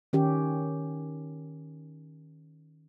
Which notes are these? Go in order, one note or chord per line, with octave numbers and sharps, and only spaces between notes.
D#3 C#4 G4